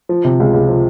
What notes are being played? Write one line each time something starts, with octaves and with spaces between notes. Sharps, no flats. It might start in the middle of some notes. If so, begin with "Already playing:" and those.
F3
C3
C#2
C#2
F3